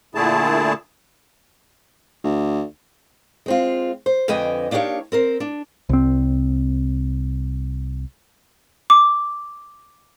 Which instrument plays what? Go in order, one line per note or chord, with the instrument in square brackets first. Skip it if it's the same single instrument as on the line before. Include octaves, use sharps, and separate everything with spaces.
[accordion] A#2 D3 A3 E4 G#4 A5
[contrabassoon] D2
[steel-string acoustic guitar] G#3 C4 F4
C5
F2 D3 B4 D#5 G5 G#5
A#3 D4 D#4 G4 C#5 F5
C4 A#4 C5
D4
[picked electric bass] C2 C4
[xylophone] D6